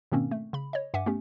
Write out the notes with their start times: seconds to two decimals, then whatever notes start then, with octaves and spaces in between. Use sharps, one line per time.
0.12 G#2 B2 D#3 A#3 C4 C#4
0.31 A3
0.53 C#3 B5
0.73 C#5 D#5
0.94 G2 E5 F#5 G#5 D6
1.06 A3 B3 C#4 G4